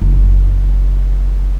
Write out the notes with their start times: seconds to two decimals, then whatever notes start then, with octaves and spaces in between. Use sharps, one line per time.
0.01 F#1